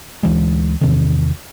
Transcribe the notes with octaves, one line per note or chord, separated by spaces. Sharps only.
D2 E3 G#3
E2 C3 D#3